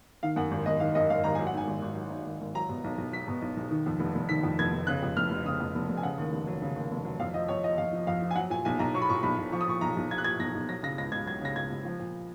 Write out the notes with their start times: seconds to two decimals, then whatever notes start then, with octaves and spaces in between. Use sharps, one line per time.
0.23 D#3 F5
0.36 F#2 F#5
0.51 G#1
0.66 G#1 D#5
0.80 D#3 F5
0.95 F#2 D#5
1.10 G#1 F5
1.24 G#1 A#5
1.35 F#3 G#5
1.47 F#5
1.53 G#2 G#5
1.67 G#1
1.82 G#1
1.96 F#3
2.11 G#2
2.26 G#1
2.41 G#1
2.55 F#3 A#5
2.69 B2
2.84 B1
2.98 B1
3.13 F#3 B6
3.28 B2
3.42 B1
3.57 B1
3.71 D#3
3.86 F2
4.00 F1
4.15 F1
4.29 D#3 B6
4.44 F2
4.59 F1 G#6
4.73 F1
4.87 C#3 F#6
5.03 F2
5.16 F1 F6
5.30 F1
5.46 C#3 D#6
5.60 F2
5.75 F1
5.89 F1
5.97 G#5
6.03 C#3 F#5
6.18 D#2
6.32 F1
6.47 F#3
6.62 C#3
6.76 D#2
6.91 F1
7.05 F#3
7.20 F2 F5
7.34 F3 D#5
7.48 F2 C#5
7.64 F3 D#5
7.78 F2 F5
7.93 F3
8.07 F2 F5
8.22 F3
8.31 G#5
8.36 F#3 F#5
8.50 A#2 G#5
8.65 B1 G#5
8.79 B1 A#5
8.94 F#3 C#6
9.02 B5
9.09 A#2 C#6
9.23 B1 B5
9.38 B1
9.52 F3 C#6
9.61 D#6
9.67 A#2 C#6
9.81 B1 A#5
9.97 B1
10.11 F3 G#6
10.18 F#6
10.24 A#2 G#6
10.39 B1 A#6
10.55 B1
10.69 F#3 A#6
10.83 C#3 A#6
10.98 C#2 A#6
11.12 C#2 G#6
11.26 F#3 G#6
11.41 C#3 A#6
11.55 C#2 G#6
11.70 C#2
11.85 F3
11.99 A#2